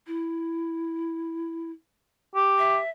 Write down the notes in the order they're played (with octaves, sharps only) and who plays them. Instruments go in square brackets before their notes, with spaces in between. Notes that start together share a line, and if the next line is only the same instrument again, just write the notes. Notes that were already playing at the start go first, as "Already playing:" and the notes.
[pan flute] E4
[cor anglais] G4
[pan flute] E5